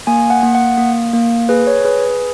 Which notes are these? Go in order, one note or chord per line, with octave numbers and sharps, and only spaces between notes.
A#3 G#5
F#5
A#3
F#5
A#3
A#3
G#4 B4
C#5
G#4 B4
B4